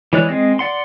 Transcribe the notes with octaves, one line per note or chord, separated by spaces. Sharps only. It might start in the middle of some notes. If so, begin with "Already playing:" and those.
E3 G#3 C#5 D5 F#6
G#3 C4 D#5
D5 F#5 C6